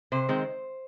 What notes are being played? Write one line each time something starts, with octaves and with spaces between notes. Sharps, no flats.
C3 C5
D#3 G#3 C4